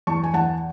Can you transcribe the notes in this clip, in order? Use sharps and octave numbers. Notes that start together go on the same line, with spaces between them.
E2 A5 C#6
G#5
E2 F#5 A5